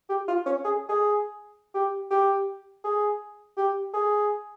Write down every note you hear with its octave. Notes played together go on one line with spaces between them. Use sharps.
G4
F4
C#4
G#4
G#4
G4
G4
G#4
G4
G#4